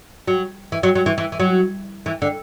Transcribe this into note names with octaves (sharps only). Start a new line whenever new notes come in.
F#3
E3
F#3
F#3
E3
E3
E3
F#3
E3
D3